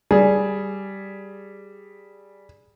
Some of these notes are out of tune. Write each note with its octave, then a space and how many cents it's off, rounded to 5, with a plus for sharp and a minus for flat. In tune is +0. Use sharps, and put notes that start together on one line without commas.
G3 -5 G#4 +0